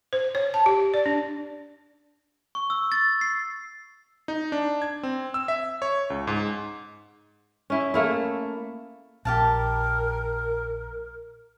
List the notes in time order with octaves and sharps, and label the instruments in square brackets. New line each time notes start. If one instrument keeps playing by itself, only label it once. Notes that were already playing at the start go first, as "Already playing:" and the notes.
[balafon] C5
C#5
A5
G4
D5
D4
[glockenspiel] C#6
E6
A6
C7
[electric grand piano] D#4
D4
G#6
C4
E6
E5
C#5
C#2
G#2
[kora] C#4 E4
A3 A#3 E4
[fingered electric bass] A#1 [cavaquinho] G4 F5 A5 [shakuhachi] A#4